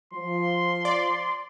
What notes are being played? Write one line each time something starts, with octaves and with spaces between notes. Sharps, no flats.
F3 C6
D5